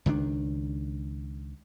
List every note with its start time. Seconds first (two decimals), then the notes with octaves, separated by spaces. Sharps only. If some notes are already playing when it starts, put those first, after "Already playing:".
0.06 C#2 D#3 F#3 D4